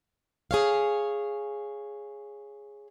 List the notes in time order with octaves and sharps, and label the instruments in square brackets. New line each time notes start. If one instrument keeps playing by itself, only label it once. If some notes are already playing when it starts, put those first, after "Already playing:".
[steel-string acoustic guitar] G#4 C#5 F5